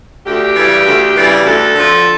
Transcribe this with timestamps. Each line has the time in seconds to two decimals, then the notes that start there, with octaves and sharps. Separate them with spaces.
0.25 D2 G4
0.55 C#3 E3 G3
0.84 D2
1.14 C#3 E3 G3
1.44 D2 A4
1.74 D3 F3